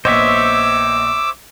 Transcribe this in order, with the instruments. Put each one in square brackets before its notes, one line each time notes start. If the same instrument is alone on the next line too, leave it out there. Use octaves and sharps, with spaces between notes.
[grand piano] A#1 B3 D#5 [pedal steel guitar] C5 C#5 E5 [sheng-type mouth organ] D6 E6